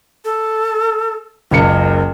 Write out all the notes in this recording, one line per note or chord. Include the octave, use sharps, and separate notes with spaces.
A4
F#1 C#2 A#4 C#7